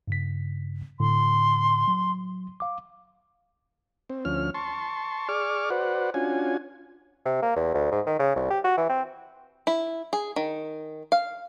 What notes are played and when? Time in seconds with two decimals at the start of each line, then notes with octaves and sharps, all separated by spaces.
0.08 G2 C#3 B6
1.00 A2 D3 C6
1.88 F#3
2.60 F5 D6
4.10 C4
4.25 D2 F3 C#4 F6
4.54 A5 C6 C#6
5.29 G#4 D5 C#6 D6 F6
5.70 F#4 B4 C5 D5 F#5
6.14 C#4 D4 F4 F#4 G#5
7.25 C3
7.42 A#3
7.56 E2
7.74 D2
7.92 G#2
8.07 D#3
8.19 C#3
8.36 C2
8.50 G4
8.64 F#4
8.77 E3
8.89 C4
9.67 E4
10.13 G#4
10.36 D#3
11.12 F5